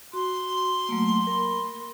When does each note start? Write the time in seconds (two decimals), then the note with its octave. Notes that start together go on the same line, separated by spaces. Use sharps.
0.13 F#4 C6
0.89 F#3 A3 A#3
1.27 A#4 B5